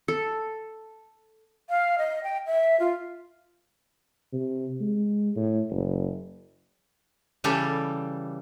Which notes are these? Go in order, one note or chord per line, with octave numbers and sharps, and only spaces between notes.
A4
F5
D#5
G5
E5
F4
C3
G#3
A2
F#1
C#3 E3 G3 G4 A4